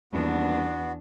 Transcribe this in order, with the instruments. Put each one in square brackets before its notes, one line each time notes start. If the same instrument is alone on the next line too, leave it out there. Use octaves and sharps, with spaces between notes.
[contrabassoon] D#1 [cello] E2 D4 [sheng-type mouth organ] B3 F#4